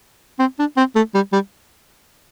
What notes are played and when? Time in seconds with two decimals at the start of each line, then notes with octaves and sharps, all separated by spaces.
0.39 C4
0.59 D4
0.77 C4
0.95 A3
1.14 G3
1.32 G3